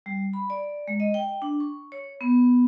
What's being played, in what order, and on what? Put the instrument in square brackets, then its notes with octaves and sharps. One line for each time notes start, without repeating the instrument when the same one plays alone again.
[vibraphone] G3
B5
D5
G#3
D#5
G5
D4
C#6
C#5
B3